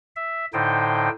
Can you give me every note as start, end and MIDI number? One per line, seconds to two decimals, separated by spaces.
0.16 0.46 76
0.53 1.09 45
0.53 1.09 50
0.53 1.09 63
0.53 1.09 72
0.53 1.09 79